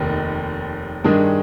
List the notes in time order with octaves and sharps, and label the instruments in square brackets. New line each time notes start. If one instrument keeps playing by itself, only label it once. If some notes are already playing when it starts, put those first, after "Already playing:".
Already playing: [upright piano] F1 D#2 D#3
G2 D#3 G#3 D4 G#4